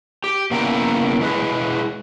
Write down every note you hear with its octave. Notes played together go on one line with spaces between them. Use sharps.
G4
C#3 A#3 B3 E4 G5 A#5
G#3 E4 G#4 B4